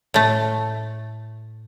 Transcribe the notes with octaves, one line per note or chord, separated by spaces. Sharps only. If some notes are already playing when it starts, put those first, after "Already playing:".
A2 A3